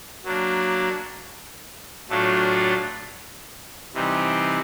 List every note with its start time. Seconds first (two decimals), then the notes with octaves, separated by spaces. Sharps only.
0.24 F#3 A#3 D4
2.09 A2 F#3 A3 D4 F4
3.94 C3 E3 G3 C4 D#4